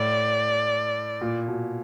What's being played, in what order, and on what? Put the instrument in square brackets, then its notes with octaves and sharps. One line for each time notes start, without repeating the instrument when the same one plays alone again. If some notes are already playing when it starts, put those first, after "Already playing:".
Already playing: [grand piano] A2 [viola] D5
[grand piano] A#2
B2